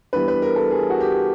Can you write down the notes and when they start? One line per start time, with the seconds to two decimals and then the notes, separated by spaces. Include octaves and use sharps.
0.13 E3 G3 B3 D4 B4
0.28 B4
0.42 A#4
0.56 A4
0.71 G#4
0.90 F#4
1.00 G4